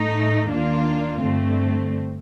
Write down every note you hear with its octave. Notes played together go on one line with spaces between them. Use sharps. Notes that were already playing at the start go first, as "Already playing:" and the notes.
Already playing: A2 A3 D#4
D#2 D#3 A#3 D4 F4
G2 D3 A3 C4